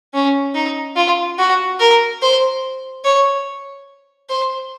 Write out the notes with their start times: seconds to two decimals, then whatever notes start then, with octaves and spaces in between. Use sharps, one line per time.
0.14 C#4
0.55 D#4
0.96 F4
1.38 F#4
1.80 A#4
2.22 C5
3.04 C#5
4.29 C5